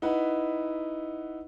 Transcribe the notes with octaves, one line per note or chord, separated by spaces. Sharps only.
D#4 E4 B4 F#5